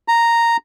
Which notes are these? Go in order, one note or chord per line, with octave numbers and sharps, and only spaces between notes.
A#5